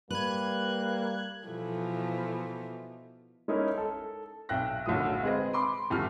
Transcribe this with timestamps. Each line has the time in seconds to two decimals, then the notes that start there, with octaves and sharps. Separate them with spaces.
0.10 G3 A#3 B4 F#6 G#6
1.48 B2 E3 F3 A3
3.48 G#3 C#4 D#4 E4 A#4
3.78 A4
4.49 B1 E5 G5 F#6 A#6
4.86 E1 B1 D3 F#3 A3 D#6
5.23 G#3 C4 G#4 B4 D#5
5.53 B5 C6 D6
5.90 G1 E2 G3 F6